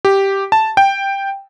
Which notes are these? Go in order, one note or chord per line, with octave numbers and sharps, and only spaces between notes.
G4
A5
G5